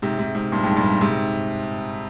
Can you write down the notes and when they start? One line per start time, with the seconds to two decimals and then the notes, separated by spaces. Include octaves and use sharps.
0.02 G#2 C3
0.18 G#2 C3
0.35 G#2 C3
0.52 G2 A#2
0.64 F2 G#2
0.76 G2 A#2
1.01 G#2 C3